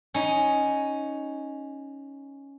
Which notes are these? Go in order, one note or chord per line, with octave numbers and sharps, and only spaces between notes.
C#4 D#4